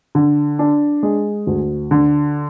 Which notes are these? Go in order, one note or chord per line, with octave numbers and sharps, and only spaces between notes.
D3
D4
G#3
D2
D3